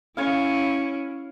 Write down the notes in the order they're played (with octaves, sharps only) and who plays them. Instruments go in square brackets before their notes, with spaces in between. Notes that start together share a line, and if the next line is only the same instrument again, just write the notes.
[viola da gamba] C#4 E4 [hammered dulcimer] C#5 F5